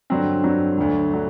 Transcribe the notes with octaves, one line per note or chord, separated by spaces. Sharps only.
G2 D3 F#3 C4
G2 D3 F#3 C4
D2 D3 F#3
D3 F#3